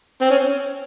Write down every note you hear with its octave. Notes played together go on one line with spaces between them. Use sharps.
C4
C#4